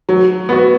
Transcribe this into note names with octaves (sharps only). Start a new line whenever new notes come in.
F#3
B3 F#4